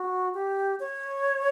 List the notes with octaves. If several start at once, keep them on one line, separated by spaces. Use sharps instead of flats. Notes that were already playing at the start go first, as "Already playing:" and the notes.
Already playing: F#4
G4
C#5